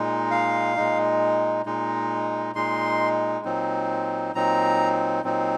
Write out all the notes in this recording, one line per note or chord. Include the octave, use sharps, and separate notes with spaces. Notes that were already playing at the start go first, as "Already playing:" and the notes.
Already playing: A#2 G#3 D#4
F5
A#2 G#3 D#4
A#2 G#3 D#4
A#2 G#3 D#4 C6
A#2 F#3 C4 D#4
A#2 F#3 C4 D#4 A#5
A#2 F#3 C4 D#4